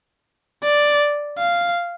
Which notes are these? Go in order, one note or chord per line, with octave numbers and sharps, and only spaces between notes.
D5
F5